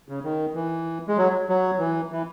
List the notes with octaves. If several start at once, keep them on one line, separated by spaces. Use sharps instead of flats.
C#3
D#3
E3
G#3
F#3
F#3
E3
E3